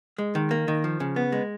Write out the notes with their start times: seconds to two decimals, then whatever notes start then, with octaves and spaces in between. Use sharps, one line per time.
0.18 G#3
0.35 D#3
0.51 A#3
0.68 D#3
0.84 F3
1.00 C#3
1.16 B3
1.32 G#3